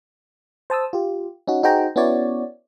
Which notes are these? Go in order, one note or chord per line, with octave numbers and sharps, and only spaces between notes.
C5 A5 D#6 E6
F4 G4
C#4 D#4 F#4
D#4 F#4 G#4 C5 G5 A#5
B3 C#4 E4 F#4 C#5 D5